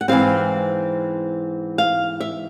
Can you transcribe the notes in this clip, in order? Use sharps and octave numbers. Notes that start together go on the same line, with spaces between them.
F#5
G#2 E3 G#3 C4 F5
F5
E5